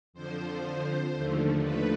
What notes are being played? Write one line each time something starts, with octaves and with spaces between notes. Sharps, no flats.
F2 D3 F3 C5
D#2 D3 F3 A3
B4